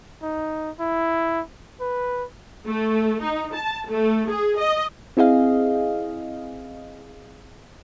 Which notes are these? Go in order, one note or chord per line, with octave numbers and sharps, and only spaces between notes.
D#4
E4
B4
A3
D#4
A5
A3
G#4
D#5
C4 E4 G#4 D#5 F5